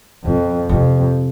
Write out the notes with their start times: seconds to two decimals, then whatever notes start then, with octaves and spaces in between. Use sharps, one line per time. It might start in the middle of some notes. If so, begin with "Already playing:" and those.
0.24 F2 B2
0.69 F2 C3